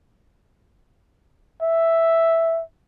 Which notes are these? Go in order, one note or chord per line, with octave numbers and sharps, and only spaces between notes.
E5